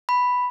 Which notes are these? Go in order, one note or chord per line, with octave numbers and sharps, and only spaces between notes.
B5